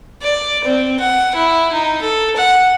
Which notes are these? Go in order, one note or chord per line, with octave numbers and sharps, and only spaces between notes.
D5
C4
F#5
E4
D#4
A4
F#5